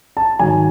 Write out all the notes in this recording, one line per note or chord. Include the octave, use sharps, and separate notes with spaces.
A5
G#2 D#3 F#3 G#5